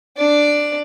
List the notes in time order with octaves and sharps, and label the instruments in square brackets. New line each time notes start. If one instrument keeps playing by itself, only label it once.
[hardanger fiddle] D4 D5